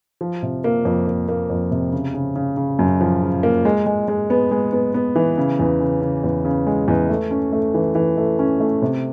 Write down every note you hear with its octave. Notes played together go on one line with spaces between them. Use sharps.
F3
C3
A#3
F2
A#3
A#3
F2
C3
C#3
C#3
C#3
C#3
F#2
F3
C#3
A#3
G#3
G#3
G#3
B3
G#3
B3
B3
E3
C#3
E2
C#3
C#3
E2
C#3
G#3
E2
A3
C#4
A3
E3
E3
A3
C#4
A3
C3